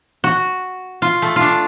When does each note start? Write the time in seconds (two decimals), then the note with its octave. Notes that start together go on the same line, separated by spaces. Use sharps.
0.24 F#4
1.02 F4
1.22 A3
1.36 F4
1.41 D4